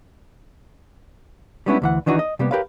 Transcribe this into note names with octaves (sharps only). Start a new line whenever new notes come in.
G3 G#3 B3 C#4 D4 E4
D2 E3 F#5
D#3 E3 D4 D#4 F#4
D#5
C3 G3 A#3 B3
G4 A#4 B4 C#5 F5